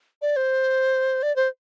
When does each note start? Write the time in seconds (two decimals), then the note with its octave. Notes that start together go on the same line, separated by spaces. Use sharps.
0.22 D5
0.36 C5
1.23 D5
1.36 C5